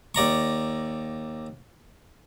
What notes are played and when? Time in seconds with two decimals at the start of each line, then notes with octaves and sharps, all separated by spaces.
0.15 D#2 D5 A#5 C#6